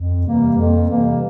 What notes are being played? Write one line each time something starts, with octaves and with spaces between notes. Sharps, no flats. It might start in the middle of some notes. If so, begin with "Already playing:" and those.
Already playing: F2
C3 E3 G3 A#3
F2
C3 E3 G3 A#3